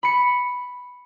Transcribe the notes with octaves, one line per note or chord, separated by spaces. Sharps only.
B5 C#7